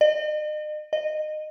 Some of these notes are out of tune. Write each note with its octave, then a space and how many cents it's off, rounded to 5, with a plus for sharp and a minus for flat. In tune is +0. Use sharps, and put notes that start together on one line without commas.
D#5 -40
D#5 -20